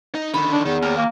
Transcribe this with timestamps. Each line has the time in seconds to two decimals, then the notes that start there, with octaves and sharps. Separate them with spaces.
0.15 D#4
0.34 D3 D#3 B5
0.52 D4
0.65 E2 D#3
0.82 D#2 A#4
0.97 A#3